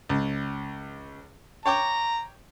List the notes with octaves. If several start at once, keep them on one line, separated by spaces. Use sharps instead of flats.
C#2
C#5 G5 A#5 D6